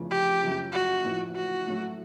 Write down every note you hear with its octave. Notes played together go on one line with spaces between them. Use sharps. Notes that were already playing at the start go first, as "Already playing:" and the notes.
Already playing: F1 E2 C#3 F3
G4
F#2 C#3 F3
F#4
A1 A2 F3
F#4
A2 F#3 A3